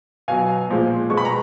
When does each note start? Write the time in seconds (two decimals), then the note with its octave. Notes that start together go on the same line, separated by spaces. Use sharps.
0.28 B2 F#3 F5 G#5
0.70 A#2 F3 G#3
1.10 B2 G#3 C#6
1.17 B5
1.25 A#5